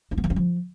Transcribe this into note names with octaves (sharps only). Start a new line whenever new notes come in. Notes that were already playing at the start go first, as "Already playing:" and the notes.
D4
B3
E3
C#4
F3